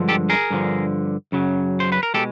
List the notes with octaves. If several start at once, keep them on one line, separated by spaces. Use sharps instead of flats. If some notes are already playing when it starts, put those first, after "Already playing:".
Already playing: G2 D3 F3 G#3
G4 A4
G#4 A#4
G2 D3 F3
F#2 C#3 F#3
C5
B4
A#4
B2 G#3 G4 A4